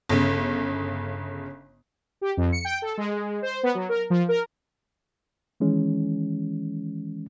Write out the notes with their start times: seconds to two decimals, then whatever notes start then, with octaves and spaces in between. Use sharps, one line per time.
0.09 G1 C#3
2.21 G4
2.37 F2
2.52 C#7
2.65 G5
2.82 A4
2.97 G#3
3.42 C5
3.63 B3
3.75 F#3
3.89 A#4
4.10 F3
4.28 A#4
5.60 D#3 E3 G#3 C#4